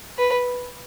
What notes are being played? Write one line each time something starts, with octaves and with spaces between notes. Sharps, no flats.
B4